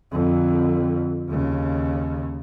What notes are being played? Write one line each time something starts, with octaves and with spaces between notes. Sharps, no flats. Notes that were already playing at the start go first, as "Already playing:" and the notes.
F2 D3
D#2 C#3